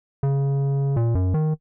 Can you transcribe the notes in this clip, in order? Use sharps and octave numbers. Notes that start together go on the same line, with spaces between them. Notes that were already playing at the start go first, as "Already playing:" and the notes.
C#3
A#2
F#2
D#3